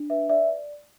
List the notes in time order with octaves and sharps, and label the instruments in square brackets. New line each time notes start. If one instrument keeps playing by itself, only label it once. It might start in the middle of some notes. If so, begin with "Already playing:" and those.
Already playing: [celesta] D4
B4 E5
D5 E5